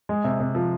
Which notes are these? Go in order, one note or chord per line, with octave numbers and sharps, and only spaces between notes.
G#3
C3
C3
F3